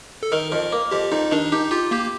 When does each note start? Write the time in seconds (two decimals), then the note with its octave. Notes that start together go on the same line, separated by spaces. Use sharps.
0.23 A4
0.32 D#3 A#4
0.52 F2 A#4
0.72 A#3
0.91 F2 G4
1.12 F2 D#4
1.31 D#3 D4
1.52 D#4 G4
1.71 F4 G4
1.91 A#3 G4